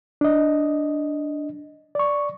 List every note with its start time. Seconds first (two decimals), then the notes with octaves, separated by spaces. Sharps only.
0.21 D4 D#5
1.95 D5 C#6